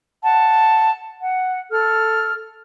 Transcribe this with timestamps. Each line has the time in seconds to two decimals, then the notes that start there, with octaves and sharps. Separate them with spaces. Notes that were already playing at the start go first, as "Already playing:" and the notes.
0.23 F#5 A5
1.21 F#5
1.71 A4 F6